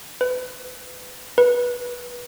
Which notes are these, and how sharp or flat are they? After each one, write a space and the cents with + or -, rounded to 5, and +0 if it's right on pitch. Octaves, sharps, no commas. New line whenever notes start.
B4 +30
B4 -20